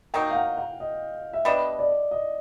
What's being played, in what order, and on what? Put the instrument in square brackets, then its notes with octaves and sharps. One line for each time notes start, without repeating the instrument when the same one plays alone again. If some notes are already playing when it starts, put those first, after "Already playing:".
[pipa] D#3 F#3 A#3 D#4 [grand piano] G5
[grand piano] F5
F#5
F#5
D#5
E5
[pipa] G3 B3 D4 [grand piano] D#5
[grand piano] D5
D#5